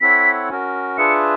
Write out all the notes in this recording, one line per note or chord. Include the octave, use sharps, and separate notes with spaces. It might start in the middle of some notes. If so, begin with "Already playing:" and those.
C4 E4 A4 C#5 F#5 B6
C#4 F#4 A#4
D4 F4 G#4 B4 E5 C#7